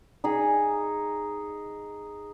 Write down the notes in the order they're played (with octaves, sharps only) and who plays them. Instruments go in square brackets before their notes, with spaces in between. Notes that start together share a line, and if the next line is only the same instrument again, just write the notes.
[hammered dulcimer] D#4 G#4